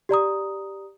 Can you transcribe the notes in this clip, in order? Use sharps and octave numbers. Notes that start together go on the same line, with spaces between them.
G4 D5 A#5 D#6